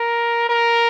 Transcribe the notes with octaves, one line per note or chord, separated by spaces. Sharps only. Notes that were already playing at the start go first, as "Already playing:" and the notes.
Already playing: A#4
A#4